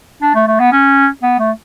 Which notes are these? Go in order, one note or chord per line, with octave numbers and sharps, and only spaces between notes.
D4
A3
A3
B3
C#4
B3
A3